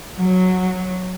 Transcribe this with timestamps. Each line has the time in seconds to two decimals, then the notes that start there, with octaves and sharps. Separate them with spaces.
0.20 F#3